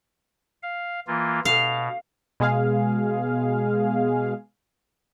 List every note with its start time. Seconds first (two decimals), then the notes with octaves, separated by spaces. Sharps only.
0.63 F5
1.07 E3 A#3 F4
1.45 B2 F5
2.40 B2 G#3 G#4 F5